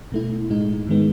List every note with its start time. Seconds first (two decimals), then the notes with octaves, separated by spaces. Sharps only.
0.12 B2 A3 E4
0.50 A2 G#3 D#4
0.87 G#2 D#3 G#3 B3